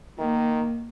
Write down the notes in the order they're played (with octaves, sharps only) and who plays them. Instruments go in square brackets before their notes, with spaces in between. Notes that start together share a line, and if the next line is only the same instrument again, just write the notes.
[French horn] D#3 [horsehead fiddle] A#3